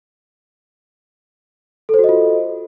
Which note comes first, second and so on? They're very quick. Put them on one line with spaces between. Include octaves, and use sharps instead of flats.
A4 C5 F#4 D#5 F4